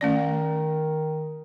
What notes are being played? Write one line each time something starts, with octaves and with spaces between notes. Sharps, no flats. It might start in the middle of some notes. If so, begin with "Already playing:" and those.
D#3 A3 C#4 D5